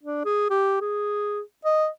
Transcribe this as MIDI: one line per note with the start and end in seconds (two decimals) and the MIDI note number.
0.03 0.23 62
0.25 0.48 68
0.50 0.79 67
0.81 1.40 68
1.65 1.87 75